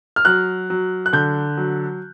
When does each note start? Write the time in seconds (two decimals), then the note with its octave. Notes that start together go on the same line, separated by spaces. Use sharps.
0.16 F6
0.25 F#3 F#6
0.70 F#3
1.06 F#6
1.13 D3 G6
1.57 F#3